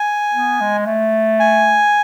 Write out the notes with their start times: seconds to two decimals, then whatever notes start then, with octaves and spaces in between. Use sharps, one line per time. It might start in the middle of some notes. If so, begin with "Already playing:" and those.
Already playing: G#5
0.34 B3
0.61 G#3
0.86 A3
1.40 G#5